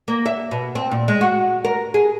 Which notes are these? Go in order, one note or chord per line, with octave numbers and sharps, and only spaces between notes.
A#3
E5
B2
C4
A#2
G#3
F#4
A#4
G#4